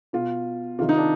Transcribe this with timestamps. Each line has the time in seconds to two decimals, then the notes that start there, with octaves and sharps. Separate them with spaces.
0.13 B2 F4
0.79 C3 D#3 F4
0.89 D#4
0.98 D4